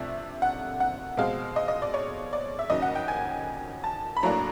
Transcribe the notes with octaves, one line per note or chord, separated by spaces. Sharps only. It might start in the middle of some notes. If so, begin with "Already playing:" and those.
Already playing: C3 F3 A3 D4 E5
F#5
F#5
B2 G#3 C4 F5
D#5
D#5
D5
C#5
D5
E5
D#2 C#3 F#3 D#5
F#5
G5
G#5
A5
B5
A2 F#3 A#3 D4 A#5